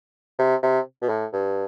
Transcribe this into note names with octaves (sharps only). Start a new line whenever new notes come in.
C3
C3
B2
A2
G2